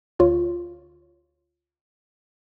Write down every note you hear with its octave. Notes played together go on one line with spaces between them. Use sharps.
D2 F4 C#5